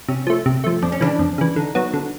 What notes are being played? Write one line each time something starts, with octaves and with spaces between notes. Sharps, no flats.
C3 C#4
F3 A3
C3
F3 A3
F2 D4
C#4
C#3 E3 D4
F2
C#3 E3
D3 D#4
F#3 B3
D3